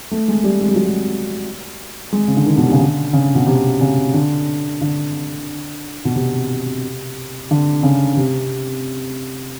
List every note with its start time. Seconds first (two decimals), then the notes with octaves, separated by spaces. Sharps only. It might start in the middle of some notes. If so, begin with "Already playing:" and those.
0.11 A3
0.28 G#3
0.44 G3
0.61 G#3
0.69 G3
0.76 F#3
0.83 G3
2.13 G#3
2.28 C#3
2.37 D3
2.46 D#3
2.57 B2
2.65 C3
2.72 C#3
2.79 D3
3.13 C#3
3.35 B2
3.47 C3
3.81 C#3
4.14 D3
4.81 D3
6.05 B2
6.15 C3
7.51 D3
7.83 C#3
8.17 C3